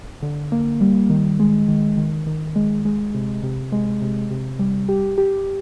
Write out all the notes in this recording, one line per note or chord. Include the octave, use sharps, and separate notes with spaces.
D3
A#3
G3
D#3
G#3
D#3
D#3
D#3
G#3
G#3
C3
C3
G#3
C3
C3
G3
G4
G4